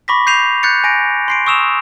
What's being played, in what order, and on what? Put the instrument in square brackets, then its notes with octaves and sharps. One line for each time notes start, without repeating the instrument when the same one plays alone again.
[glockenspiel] B5 C#6 D6 A#6 B6
G6 C7 D#7 F7
F#6 G6 A6 C#7
G#5 A#6 D7
C6 C7 D7
C#6 D#6 E6 E7 F7